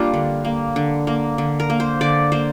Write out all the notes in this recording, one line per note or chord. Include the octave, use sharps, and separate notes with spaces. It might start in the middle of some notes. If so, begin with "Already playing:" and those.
Already playing: G3 A#3 D4 F4
D3
A#3
D3
A#3
D3
A#4
A#3
C5
D3 D5
A#3 C5